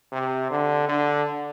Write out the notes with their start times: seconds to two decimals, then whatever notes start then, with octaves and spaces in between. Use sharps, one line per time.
0.12 C3
0.51 D3
0.89 D3